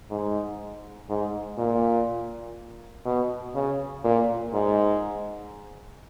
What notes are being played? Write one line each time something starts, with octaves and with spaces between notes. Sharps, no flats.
G#2
G#2
A#2
B2
C#3
A#2
G#2